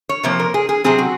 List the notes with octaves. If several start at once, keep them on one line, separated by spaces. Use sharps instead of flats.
C#5
C3 F3 A#3 C5
A#4
G#4
G#4
C3 F#3 C4 G#4
F#4